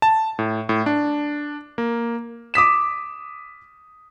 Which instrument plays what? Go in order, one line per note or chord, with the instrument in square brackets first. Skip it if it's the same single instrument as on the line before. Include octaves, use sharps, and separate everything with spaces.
[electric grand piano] A5
A2
A2
D4
A#3
[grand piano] D6 D#6 B6 E7